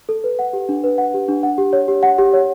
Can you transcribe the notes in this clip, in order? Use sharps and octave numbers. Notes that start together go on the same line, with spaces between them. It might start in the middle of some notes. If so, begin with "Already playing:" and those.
A4
B4
F#5
G4
D4
B4
F#5
G4
D4
F#5
G4
C#5
G4
F#5
G4
C#5